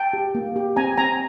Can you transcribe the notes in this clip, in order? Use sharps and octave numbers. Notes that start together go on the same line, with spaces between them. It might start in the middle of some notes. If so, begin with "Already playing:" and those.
Already playing: G5 A5
G4
A#3
G4
C4 G#5 A#5
C4 G#5 A#5